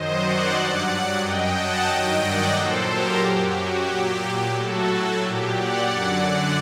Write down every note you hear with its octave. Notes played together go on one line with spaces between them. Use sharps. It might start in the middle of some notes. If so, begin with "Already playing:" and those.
Already playing: F#2 D#3 F#3 C5 D#5
D5 F#5
G2 F#3
F#2 F#3 D#5 G5
F#5 A5
G2 D#3 F#3 D#5 G5
D5 F#5
A#2 F#3 A4 C5
G4 A#4
F#2 F#3 G4
F#4
A#2 F#3 G4
A2 F#3 F#4 A4
A#2 F#3 G4
D5 F#5
F#2 D3 F#3 D5 F#5